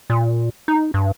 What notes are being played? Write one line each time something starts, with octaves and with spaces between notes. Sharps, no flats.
A#2
D#4
G2